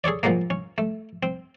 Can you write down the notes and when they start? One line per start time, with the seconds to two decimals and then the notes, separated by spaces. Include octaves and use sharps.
0.04 G#4 A4 C#5 D5
0.23 A#2 F3 F#3 G#3 A#3
0.50 C#4
0.78 A3
1.23 C4